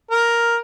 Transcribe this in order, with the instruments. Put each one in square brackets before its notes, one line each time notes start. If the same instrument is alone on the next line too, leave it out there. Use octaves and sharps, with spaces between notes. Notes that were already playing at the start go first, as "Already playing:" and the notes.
[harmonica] A#4